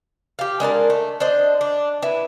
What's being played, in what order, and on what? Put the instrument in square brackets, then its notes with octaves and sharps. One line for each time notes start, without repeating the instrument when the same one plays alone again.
[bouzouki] G4 F5
G#3 D4 A#4 A5
A3
D4 C5 D#5
D4
E4 B4